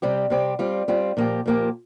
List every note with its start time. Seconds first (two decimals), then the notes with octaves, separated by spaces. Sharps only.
0.02 C3 G3 C4 G4
0.30 C3 G3 C4 G4
0.59 G3 C4 F4
0.88 G3 C4 F4
1.17 A#2 F3 A#3 G4
1.46 A#2 F3 A#3 G4